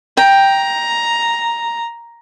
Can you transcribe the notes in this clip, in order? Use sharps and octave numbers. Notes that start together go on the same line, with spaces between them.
G5 A#5